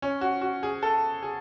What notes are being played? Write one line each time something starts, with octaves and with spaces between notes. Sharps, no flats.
C#4
F#4
F#4
G#4
A4
G#4